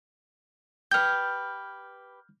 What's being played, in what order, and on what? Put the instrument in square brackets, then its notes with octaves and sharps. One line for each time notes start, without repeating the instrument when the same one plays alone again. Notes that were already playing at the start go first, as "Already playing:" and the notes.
[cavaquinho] G4 B4 [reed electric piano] F6 G6